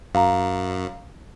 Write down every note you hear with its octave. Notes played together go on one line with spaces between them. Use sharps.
F#2 F5 A#5